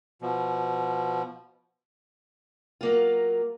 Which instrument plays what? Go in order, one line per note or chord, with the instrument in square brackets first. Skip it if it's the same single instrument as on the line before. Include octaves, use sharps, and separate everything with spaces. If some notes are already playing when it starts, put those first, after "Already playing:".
[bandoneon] B2 F3
[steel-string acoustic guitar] F#3 A#3 F4